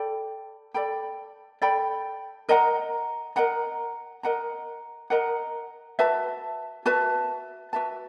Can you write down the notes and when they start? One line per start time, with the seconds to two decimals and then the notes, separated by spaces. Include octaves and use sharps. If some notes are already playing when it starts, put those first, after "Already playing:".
Already playing: A4 D5 G5 B5
0.74 A4 D5 G5 B5
1.62 A4 D5 G5 B5
2.49 A#4 D#5 F#5 A#5
3.36 A#4 D#5 F#5 A#5
4.23 A#4 D#5 F#5 A#5
5.10 A#4 D#5 F#5 A#5
5.99 F#4 B4 E5 A5
6.86 F#4 B4 E5 A5
7.73 F#4 B4 E5 A5